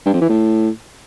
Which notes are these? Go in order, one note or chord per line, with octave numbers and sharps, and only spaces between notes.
G2
F2
E3
A2